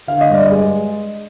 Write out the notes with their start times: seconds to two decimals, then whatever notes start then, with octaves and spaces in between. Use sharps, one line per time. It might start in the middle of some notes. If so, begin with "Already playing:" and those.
0.07 D3 F5
0.21 D#5
0.30 G2 D5
0.46 G#3 D#5